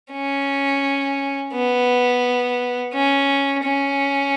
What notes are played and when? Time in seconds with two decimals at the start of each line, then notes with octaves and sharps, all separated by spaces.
0.12 C#4
1.54 B3
2.93 C#4
3.64 C#4